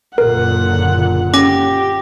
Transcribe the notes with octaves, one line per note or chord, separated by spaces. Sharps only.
F#1 A#2 D3 A#4 F#5
C#4 G4 D6 A#6